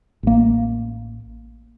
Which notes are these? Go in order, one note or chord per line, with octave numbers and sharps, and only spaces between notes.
A1 A#3